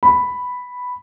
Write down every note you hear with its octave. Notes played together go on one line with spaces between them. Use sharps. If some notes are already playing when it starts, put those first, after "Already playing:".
B5